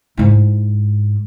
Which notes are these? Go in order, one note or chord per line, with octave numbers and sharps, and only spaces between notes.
G#2 E4